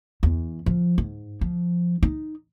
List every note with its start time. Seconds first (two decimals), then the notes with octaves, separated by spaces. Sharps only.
0.23 E2
0.66 F3
0.98 G#2
1.41 F3
2.03 D#4